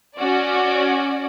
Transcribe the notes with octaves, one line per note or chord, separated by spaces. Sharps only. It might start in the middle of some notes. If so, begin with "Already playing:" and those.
C#4 F#4 D5